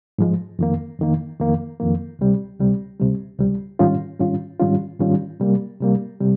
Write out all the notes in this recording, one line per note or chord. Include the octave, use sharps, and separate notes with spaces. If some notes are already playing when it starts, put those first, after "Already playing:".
G#2 F3 G#3
F2 D#3 A#3
F2 D#3 A#3
F2 D#3 A#3
F2 D#3 A#3
C#2 C3 G3
C#2 C3 G3
C#2 C3 G3
C#2 C3 G3
G#2 D#3 G3 C#4 F4
G#2 D#3 G3 C#4 F4
G#2 D#3 G3 C#4 F4
G#2 D#3 G3 C#4 F4
C3 G3 A#3
C3 G3 A#3
C3 G3